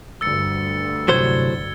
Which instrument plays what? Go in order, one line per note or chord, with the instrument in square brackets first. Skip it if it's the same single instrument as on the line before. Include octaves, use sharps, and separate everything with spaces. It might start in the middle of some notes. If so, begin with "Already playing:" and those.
[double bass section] D2 G2 [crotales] E6 A6 C#7
[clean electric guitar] A2 F#3 C5 [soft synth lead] C3 [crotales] G#6 G7